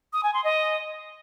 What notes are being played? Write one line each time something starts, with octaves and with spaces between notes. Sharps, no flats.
D#6
G#5
C6
D#5